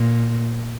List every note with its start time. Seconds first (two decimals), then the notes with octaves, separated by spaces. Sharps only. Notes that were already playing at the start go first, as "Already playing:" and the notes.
Already playing: A#2